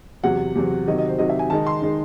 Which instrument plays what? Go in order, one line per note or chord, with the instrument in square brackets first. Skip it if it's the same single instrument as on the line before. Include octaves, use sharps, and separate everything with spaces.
[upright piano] E2 C3 F#3 F#5
E2 C3 F#3
C3 D#3 F#3 D#5
D#5
C5
C3 D#3 F#3 D#5
E5
G#5
D#3 G#3 D#4 A5
C6
D#3 G#3 D#4